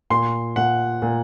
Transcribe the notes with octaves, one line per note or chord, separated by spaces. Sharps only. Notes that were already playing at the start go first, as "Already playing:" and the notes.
A#2 C6
A#2 F#5
A#2